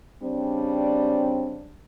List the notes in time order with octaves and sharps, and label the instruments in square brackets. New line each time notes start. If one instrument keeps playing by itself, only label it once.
[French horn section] C#3 G3 D4 [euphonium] C4